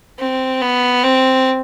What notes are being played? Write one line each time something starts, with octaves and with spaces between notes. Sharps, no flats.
C4
B3
C4